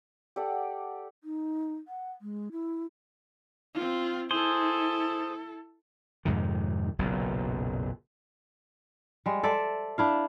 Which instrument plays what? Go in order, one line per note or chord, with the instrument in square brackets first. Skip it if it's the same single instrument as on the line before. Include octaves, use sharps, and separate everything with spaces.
[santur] G4 A4 D5 F#5
[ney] D#4
F#5
G#3
E4
[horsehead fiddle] C4 F4
[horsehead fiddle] E4 A4 [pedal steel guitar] G#4 C5
[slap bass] F2 G#2 C3 D#3
F#1 B1 F#2 A#2
[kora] G3 G#3
A4 C5 D5 E5
D4 E4 F5